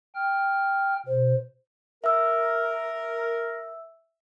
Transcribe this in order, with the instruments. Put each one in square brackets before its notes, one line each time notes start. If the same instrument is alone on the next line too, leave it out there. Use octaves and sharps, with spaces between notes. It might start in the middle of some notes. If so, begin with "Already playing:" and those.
[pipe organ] G5 F6
[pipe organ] B2 [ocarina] C5
[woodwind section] A#4 [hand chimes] E5 E6